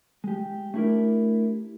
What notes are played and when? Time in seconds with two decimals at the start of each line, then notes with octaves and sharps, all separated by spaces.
0.24 G#3 G4
0.74 A3 D4 E4 F#4 G4 A#4